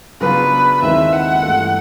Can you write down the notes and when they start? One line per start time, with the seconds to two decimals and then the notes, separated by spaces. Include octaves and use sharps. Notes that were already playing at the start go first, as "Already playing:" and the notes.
0.21 C#3 F#3 B3 D4 F4 B4
0.81 D#2 D#3 G#3 C4 E4 E5
1.12 F#5
1.43 G2 E3 A3 C#4 F4